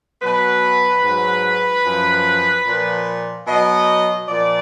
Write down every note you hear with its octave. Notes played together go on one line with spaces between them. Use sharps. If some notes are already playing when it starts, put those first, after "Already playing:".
B2 F#3 B4
G#2 F#3
F#2 F3
A#2 F3
B2 F#3 D#5
A#2 F3 D5